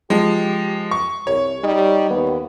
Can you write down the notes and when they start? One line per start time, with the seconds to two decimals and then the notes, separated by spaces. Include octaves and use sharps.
0.10 F3 G#3 G4
0.91 C#6
1.27 C2 C#5
1.63 G3 D#4
2.10 D#2 B3